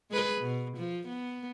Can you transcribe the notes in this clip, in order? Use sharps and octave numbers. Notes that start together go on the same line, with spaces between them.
G#3 G#4 B4
B2
F3
B3